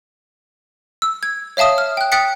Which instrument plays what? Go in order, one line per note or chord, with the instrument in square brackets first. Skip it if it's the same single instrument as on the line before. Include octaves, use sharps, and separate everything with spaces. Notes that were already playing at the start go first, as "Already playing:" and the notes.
[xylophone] E6
G#6
C#5 E5 F5 A5 D#6
F6
G5 F#6
G5 D#6 F#6 A6 B6 C#7